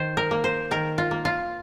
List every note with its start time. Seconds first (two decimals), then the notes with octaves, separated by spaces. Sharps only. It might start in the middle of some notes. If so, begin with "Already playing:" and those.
Already playing: D#3 C5
0.17 A#4
0.31 A#3
0.44 C5
0.71 D#3 A#4
0.98 F4
1.11 A#3
1.25 F4